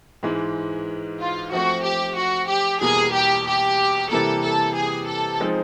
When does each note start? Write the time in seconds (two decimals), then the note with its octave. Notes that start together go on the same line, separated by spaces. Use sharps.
0.23 G#2 E3 G#3
1.20 F4
1.52 F3 A3 C4 F#4
1.84 G4
2.17 F#4
2.49 G4
2.81 E2 B2 G3 A#3 G#4
3.14 G4
3.47 G4
4.11 C3 E3 G3 A#3 A4
4.43 A4
4.76 G#4
5.08 A4
5.40 F3 G#3 C4 D#4